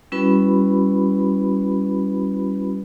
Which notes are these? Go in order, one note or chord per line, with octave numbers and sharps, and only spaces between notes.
G3 C#4 E4 F#4 B4 B5